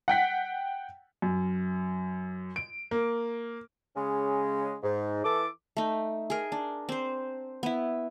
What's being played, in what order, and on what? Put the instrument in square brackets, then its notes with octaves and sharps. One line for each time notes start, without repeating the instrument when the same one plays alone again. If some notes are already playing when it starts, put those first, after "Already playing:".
[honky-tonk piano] F#5 G5 B6
[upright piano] F#2
D7
A#3
[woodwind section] C#3 G#3 C#4
G#2
E3 A4 D6
[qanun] A3 D#4
G#4 A#4
D4
C4 C5
B3 E4